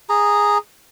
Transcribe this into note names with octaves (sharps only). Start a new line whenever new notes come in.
G#4 A#5